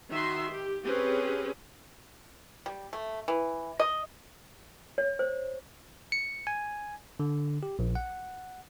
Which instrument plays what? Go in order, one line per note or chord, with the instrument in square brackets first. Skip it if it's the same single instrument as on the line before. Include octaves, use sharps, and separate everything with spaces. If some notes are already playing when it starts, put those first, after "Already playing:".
[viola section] D#3 F#4 E5 C6
G4
C4 C#4 G4 G#4 B4
[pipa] G3
A3
E3
D#5
[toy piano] C#5
C5
[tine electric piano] C#7
G#5
D3
G4
A#1
F#5